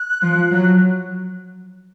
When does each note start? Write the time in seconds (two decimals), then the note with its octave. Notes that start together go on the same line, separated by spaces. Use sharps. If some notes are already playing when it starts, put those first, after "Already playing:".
Already playing: F#6
0.22 F3
0.52 F#3